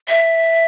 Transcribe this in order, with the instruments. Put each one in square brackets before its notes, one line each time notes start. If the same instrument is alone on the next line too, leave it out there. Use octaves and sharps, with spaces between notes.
[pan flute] E5